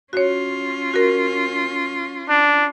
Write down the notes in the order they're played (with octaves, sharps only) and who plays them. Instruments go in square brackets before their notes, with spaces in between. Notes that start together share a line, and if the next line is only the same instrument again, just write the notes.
[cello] C#4 F4 [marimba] F#4 C#5
[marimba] F#4 A#4
[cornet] D4